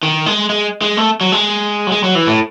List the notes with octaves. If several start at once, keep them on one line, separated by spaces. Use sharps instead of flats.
D#3
G#3
G#3
G#3
A3
F#3
G#3
F#3
G#3
F#3
E3
A2